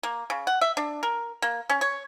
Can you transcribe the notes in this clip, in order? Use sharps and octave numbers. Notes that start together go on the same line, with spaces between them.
A#3
C#3
F#5
E5
D4
A#4
A#3
C#4
C#5